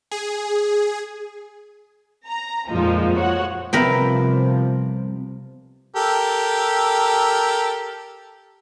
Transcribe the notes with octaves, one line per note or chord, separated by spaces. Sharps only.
G#4
A#5
F2 A#2 F3 G#3 D#4
F3 F#4 C#5 F#5
C2 C3 F3 B3 A#4 B4 E5 G5
G4 A4 A#4